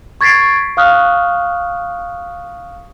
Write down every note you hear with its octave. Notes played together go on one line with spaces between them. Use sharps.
C#6 G#6 A6 B6 C7 D7
F5 C#6 D#6 F6 F#6